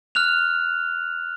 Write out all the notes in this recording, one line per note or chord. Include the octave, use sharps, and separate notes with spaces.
F6 F#6 F7